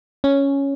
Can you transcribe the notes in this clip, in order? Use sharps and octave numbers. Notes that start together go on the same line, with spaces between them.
C#4